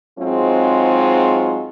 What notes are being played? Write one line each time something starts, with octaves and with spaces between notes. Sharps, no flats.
G#2 F#3 G#3 C4 F4